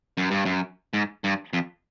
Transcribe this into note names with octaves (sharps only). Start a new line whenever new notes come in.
F#2
G2
F#2
G#2
G2
F2